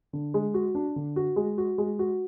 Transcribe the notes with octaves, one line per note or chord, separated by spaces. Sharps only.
D3
G#3
F#4
D4
D3
F#4
G#3
F#4
G#3
F#4